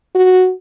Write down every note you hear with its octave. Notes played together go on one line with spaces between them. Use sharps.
F#4